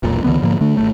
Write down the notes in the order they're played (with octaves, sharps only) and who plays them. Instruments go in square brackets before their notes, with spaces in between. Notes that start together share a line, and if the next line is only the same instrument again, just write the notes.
[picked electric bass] E1 B1 A#2
C#2 D3 E3 B3
G#2 D3 F3 A#3
D3 A3 D4
G#1 C#2 A3